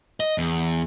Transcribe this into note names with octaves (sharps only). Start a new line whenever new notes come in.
D#5
E2